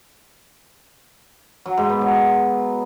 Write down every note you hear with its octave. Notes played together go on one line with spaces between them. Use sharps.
F#3
G#2
B3
F#3